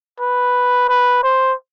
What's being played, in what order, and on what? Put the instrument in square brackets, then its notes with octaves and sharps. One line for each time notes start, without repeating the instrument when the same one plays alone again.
[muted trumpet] B4
B4
C5